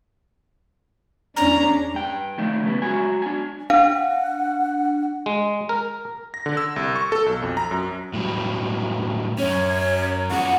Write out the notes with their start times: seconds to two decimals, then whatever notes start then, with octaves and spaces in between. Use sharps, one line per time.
1.36 E2 C#4 D4 A#5
1.94 G2 G5
2.38 D#3 F3 A3 D4
2.63 C#3 G3 B3
2.82 F#3 G#3 F#4 G#5
3.22 D4 G#5
3.70 D4 F5 F#5
5.26 G#3
5.69 A#4
6.34 A#6
6.46 D3
6.57 E6
6.76 C2
6.96 C#6
7.12 A4
7.26 B1
7.42 F2
7.57 A#5
7.71 F#2
8.13 A2 F#3 G3
9.39 F#2 C#4 C#5
10.31 F2 F4 G#4 F#5